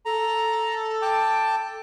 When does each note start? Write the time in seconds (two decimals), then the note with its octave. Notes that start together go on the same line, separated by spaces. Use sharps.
0.05 A4 A#5
1.02 G5 A5 D6